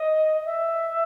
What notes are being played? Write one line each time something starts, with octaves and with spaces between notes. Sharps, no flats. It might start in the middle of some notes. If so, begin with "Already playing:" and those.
Already playing: D#5
D#5
E5